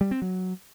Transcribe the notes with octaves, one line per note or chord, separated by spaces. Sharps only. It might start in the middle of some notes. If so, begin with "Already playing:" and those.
G3
C4
F#3